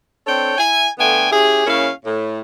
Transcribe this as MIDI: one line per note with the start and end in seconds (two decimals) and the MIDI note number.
0.27 0.55 60
0.27 0.55 62
0.27 0.55 69
0.27 0.55 73
0.27 0.55 79
0.58 0.88 64
0.58 0.88 80
0.99 1.29 50
0.99 1.29 57
0.99 1.29 59
0.99 1.29 79
0.99 1.29 80
1.32 1.66 61
1.32 1.66 64
1.32 1.66 67
1.32 1.66 68
1.66 1.90 49
1.66 1.90 58
1.66 1.90 61
1.66 1.90 64
1.66 1.90 77
2.05 2.40 45